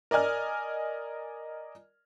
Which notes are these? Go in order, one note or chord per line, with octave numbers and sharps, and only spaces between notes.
A#4 D5 D#5 G#5 F6